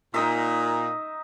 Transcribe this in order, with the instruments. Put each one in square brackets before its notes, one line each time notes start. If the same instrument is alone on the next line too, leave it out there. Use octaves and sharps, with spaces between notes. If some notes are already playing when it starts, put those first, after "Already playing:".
[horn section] A#2 [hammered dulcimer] D#4 D#5 E5